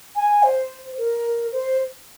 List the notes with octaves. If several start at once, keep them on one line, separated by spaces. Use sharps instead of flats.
G#5
C5
A#4
C5